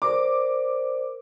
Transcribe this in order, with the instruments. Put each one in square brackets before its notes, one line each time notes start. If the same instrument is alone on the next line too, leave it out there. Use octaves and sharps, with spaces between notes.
[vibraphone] A#4 C5 D5 [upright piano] D6